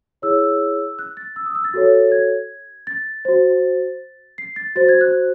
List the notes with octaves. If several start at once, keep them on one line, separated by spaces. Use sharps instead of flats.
E4 G#4 C#5 E6
F#6
A6
E6
D#6
E6
A6
F#4 A4 C#5
G#6
A6
F#4 C5
C7
A6
F#4 C5 A6
G#6
F#6